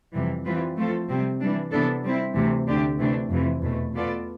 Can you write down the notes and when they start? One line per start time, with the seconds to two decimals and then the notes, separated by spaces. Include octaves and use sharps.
0.14 F2 C3 E3 G3
0.45 E3 G3 C4 F4 B4
0.77 F3 A3 C4 F4 A4
1.08 C3 G3 C4
1.40 E3 G3 D4
1.71 C3 E3 B3 D4 A4
2.03 G3 C4 E4
2.35 D2 C3 E3 A3
2.66 D2 D3 A3 D4 G4
2.98 C3 E3 A3 D4
3.30 F2 C3 E3
3.62 E2 B2 A3
3.94 B2 B3 F4 A4 D5